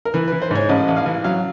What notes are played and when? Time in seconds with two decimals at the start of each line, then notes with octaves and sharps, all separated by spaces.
0.05 A#4
0.14 E3 B4
0.28 E3 B4
0.42 C5
0.51 G#2 C#5
0.69 A1 D#5
0.88 A1
0.97 F5
1.06 E3
1.24 F#3 F5